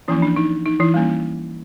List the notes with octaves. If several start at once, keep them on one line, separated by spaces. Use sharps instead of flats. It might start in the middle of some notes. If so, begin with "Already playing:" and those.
E3 F3 A#3 C#4 E4
D4
D#4
D#4
E3 E4
G3 A#3 C#4